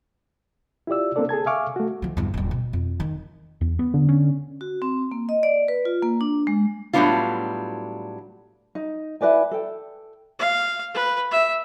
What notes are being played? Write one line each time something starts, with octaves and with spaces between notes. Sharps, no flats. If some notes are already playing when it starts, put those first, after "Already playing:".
E4 F4 G4 D5 E6
A#3 C4 D4 A4 D5
G#4 A4 A5 G#6
E5 F5 G#5 C#6 D6 F6
A3 F#4
D#3 F3
E2 G2
D#1 G2
B2
F2
D#3
E2
B3
D3
C#4
F#4
C4
A#3
D#5
D5
B4
F4
A#3
D4
G#3
A2 F#3 G3 B3 D4 F4
D#4
E4 B4 D5 G#5
A4 G5
F5
B4
E5